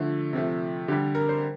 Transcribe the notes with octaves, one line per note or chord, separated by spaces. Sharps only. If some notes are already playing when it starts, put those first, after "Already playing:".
Already playing: D3 F3 A3
C3 F3 A3
D3 G3 G4
A#4
C5